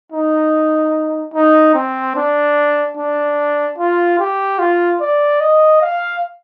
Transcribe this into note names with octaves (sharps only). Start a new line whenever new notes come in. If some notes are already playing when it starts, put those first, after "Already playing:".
D#4
D#4
C4
D4
D4
F4
G4
F4
D5
D#5
F5